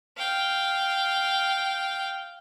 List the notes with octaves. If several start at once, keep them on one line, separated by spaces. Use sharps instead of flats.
F5 G5